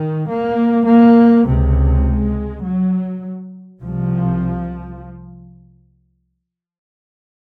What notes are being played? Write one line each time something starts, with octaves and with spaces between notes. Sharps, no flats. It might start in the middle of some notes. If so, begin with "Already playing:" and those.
Already playing: D#3
A#3
A#3
C#2 C3
G#3
F#3
C2 C3 F3